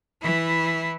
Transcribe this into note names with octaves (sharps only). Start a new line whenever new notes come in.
E3 E4